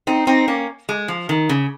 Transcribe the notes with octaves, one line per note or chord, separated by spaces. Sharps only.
C4 D#4
C4 D#4
A#3 C#4
G#3
F3
D#3
C#3